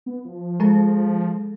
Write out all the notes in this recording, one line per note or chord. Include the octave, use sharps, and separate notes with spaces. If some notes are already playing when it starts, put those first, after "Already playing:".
B3
F3
G#3 G#4 A4